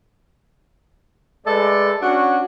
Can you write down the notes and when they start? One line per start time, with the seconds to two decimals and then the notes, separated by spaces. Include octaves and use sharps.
1.47 G#3 A3 A4 B4 D5
2.02 C#4 D4 F#4